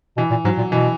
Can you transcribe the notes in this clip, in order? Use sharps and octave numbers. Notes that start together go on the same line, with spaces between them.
B2 E3
A#2
G#2 F#3
A#2
B2 E3